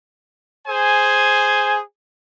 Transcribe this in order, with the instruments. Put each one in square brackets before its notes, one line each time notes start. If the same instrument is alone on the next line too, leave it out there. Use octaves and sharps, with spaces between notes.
[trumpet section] G#4 C5 G#5